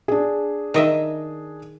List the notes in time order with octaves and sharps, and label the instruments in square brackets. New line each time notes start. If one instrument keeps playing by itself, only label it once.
[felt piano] D4 G#4
[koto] D#3 D#5 E5